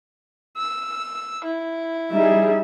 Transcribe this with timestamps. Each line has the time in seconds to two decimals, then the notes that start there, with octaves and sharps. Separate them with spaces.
0.57 E6
1.44 E4
2.12 G3 D#4 G#4 E5